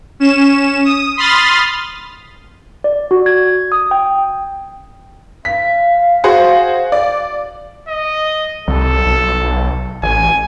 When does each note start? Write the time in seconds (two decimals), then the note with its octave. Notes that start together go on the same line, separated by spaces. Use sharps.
0.20 C#4 E7
0.84 D#6
1.17 B5 C6 D#6 F6 A6
2.84 D5
3.11 F#4
3.26 G#6
3.72 D#6
3.91 G5
5.45 F5 B6
6.24 F#4 G#4 C5
6.92 D5
7.89 D#5
8.68 C2 A4
9.06 B1
10.03 A1 G#5